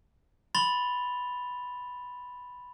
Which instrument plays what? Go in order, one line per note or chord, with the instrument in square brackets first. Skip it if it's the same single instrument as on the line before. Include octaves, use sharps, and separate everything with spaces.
[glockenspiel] B5 C6 A6 F7 G7